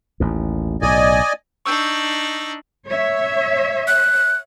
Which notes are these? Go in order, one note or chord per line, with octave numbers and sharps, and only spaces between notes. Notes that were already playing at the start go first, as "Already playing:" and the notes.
A1 D#2
B1 A2 D5 D#5 G#5
D4 D#4 C#6 E6 G6
C#5 E5
F#6